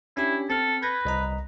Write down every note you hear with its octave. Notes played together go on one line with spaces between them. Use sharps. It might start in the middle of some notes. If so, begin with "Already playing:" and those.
C#4 D4 E4 G4
C4 A4 F6
B4 G6 G#6 A#6
C2 D#5 A#5